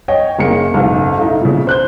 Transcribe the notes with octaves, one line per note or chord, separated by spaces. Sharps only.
C#5 D#5 G5
F#1 A#3 G#4 C#7
F#1 B1 G#2
D#4 E4 A4 F5
A#2 C#3
C5 F#6 G6